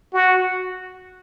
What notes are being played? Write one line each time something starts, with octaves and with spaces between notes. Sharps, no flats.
F#4